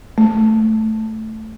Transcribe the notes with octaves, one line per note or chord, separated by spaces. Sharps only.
A3